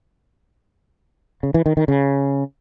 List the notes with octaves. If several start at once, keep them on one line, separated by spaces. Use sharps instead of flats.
C#3
E3
D#3
D#3
C#3